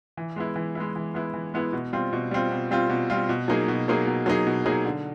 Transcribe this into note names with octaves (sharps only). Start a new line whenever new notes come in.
E3
G#3 B3 E4
E3
G#3 B3 E4
E3
G#3 B3 E4
E3
G#3 B3 E4
B2
G3 C4 F4
B2
G3 C4 F4
B2
G3 C4 F4
B2
G3 C4 F4
B2
F#3 A#3 D#4 G#4
B2
F#3 A#3 D#4 G#4
B2
F#3 A#3 D#4 G#4
B2
F#3 A#3 D#4 G#4
D3